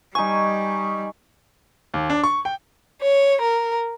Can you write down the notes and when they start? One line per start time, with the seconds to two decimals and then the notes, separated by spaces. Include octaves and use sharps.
0.15 G3 D#4 G#5 C#6
1.94 D#2
2.10 D4
2.24 C#6
2.45 G5
3.01 C#5
3.41 A#4